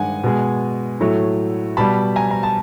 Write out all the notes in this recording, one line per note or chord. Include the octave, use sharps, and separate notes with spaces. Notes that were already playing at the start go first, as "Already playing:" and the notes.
Already playing: G2 D#3 G#3 F#5 G#5
B2 G#3
A2 F#3 A3
B2 G3 A5 B5
G#5 A#5
A#5
A5